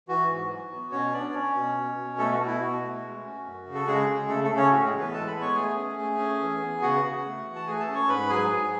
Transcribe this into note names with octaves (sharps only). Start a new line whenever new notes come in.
E3 F#4
G#2
F#3
B3
B2 C#4 C#5
B3 D4 D5
C#4 C#5
B2
B2
B2
A3 A4
F#4
B2
E4
B2 F#4
A3
G#3
C#4
F#2
C#3
A4
C#3 G#3 G#4
C#3
C#3 A3 A4
A3 A4
C#3
C#4 C#5
A2 F#4
G#3 G#4
E3
B3 B4
G#3 A4 A5
B4 B5
B3
C#5 C#6
A3 G#4 G#5
C#4
A3
C#4
E3
B3
C#3 F#4 F#5
C#3
A3
E3
A5
A3 G#4 G#5
A4 A5
C#4
C#5 C#6
G#2 B4 B5
F#3 G#4 G#5
G#2